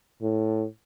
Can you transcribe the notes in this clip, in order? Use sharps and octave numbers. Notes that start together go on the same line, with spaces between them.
A2